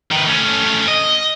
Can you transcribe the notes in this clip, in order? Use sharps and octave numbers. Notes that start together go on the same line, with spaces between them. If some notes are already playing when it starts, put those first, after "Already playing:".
D#3 B4
A3 C#4
D#5